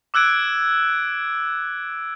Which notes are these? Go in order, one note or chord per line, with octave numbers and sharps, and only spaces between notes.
D6 E6 F#6 G#6 D7